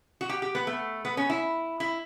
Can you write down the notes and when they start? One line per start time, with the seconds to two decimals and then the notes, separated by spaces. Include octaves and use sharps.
0.21 F#4
0.29 G4
0.42 G4
0.55 B3
0.67 A3
1.05 B3
1.17 C#4
1.30 E4
1.80 E4